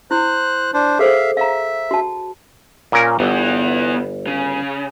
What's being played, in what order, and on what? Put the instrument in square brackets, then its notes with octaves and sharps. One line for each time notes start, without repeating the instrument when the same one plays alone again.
[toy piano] E4 [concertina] C5 F#6
[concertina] D4 C5
[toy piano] G#4 A4 C5 [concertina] E5 F5
[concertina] E5 [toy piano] F5 A#5
[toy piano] F#4 A5
[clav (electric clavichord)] A#2 C#4 A#4
[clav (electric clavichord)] G1 [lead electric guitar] B3 E4
[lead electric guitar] C#3